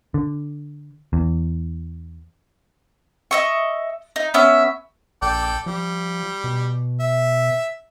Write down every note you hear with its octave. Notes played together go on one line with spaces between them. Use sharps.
D3
E2
D#5 E5 C#6
D#4
B3 C#4 E5
A#1 A4 D5 G5
F3 G3
B2
E5